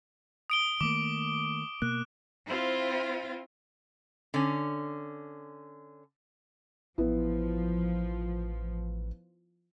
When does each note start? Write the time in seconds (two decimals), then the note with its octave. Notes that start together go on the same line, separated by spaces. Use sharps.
0.50 D#6 D7 G7
0.81 D#3 A3 A#3 D6
1.82 B2 A#3 F#6
2.47 C4 E4 F4 C5 F5
4.34 D3 C#4
6.98 A1 F3 B3 E4